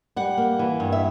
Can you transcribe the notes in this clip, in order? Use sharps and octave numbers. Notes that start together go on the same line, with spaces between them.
G3 F#5
A#3
E3
G2
E5